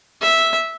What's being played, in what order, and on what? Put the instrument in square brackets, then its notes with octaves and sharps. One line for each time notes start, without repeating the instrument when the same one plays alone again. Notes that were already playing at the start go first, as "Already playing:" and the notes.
[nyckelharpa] E5